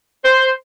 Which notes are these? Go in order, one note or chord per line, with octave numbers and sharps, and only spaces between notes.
C5